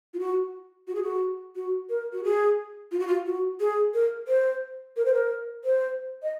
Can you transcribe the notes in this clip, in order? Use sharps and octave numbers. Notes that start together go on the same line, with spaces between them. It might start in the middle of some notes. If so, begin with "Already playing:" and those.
F4
F#4
F#4
G#4
F#4
F#4
A#4
F#4
G#4
F4
F#4
F4
F#4
G#4
A#4
C5
A#4
C5
A#4
C5
D#5